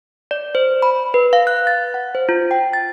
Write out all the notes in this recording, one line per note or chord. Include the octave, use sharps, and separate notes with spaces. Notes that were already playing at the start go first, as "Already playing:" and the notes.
D5
C5
B5
B4
F5
F#6
A6
F#5
C5
F4
G5
A6